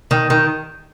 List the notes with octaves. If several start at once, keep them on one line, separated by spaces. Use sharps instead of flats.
D#3
D#3